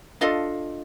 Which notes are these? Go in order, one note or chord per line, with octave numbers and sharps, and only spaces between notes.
D4 F4 A4 D#5 F5